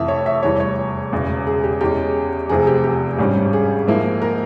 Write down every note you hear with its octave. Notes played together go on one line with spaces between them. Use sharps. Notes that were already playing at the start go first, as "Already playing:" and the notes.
Already playing: F1 F2 E3 E5
C#5
E5
F1 E2 E3 G3 C#5
C#5
E1 E2 C#3
G#4
G4
E2 E3 G#3 C#4 G4
F1 E2 C3 F3 G#4
G4
G4
G#1 G2 G3 C#4
G#4
G#2 F3 A#3 E4
A#4